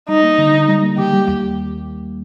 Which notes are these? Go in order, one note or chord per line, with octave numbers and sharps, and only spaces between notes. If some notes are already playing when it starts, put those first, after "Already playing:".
G3 D#4
A#3
D3
D3
G3
A#3
D#3 G4
G3
D#2